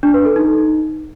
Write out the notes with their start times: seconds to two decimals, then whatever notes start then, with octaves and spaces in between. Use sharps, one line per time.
0.03 D4
0.14 B4
0.25 A4
0.36 D#4